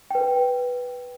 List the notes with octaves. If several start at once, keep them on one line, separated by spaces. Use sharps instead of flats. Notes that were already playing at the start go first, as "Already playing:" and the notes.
B4 G5